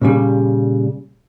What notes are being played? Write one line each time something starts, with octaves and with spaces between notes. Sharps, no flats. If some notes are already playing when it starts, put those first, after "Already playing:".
A#2 C#3 G3